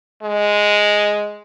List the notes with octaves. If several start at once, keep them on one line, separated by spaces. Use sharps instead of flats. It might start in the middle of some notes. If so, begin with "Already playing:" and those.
G#3